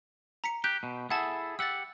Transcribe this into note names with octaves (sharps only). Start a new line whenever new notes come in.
A#5 B6 C#7
G4 F#6 G6
B2
E4 G#4 A4 F#5 A5
G4 F#5 E6 A6